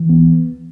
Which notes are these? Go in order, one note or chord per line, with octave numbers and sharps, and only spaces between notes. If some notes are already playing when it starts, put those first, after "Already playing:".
Already playing: E3
C#2 B3